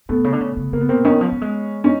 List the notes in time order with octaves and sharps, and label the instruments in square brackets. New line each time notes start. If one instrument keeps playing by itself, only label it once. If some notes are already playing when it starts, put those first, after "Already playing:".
[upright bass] B2 [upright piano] A3 B3
[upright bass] C#3
D3
C#3
C#3
[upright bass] C#3 [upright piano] A#3
[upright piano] B3
[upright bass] B2 [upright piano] A#3 C4
[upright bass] D#3 [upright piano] B3 C#4
[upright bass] F3
G3
G#3
[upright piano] C#4 D#4